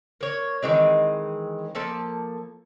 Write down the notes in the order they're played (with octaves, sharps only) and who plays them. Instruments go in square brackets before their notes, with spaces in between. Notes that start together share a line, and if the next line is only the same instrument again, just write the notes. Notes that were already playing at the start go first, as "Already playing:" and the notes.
[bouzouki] A#3 C#5
D#3 E3 G#3 C4
F3 A#3 A4 A5